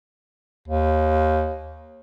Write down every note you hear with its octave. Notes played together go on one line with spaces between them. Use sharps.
D#2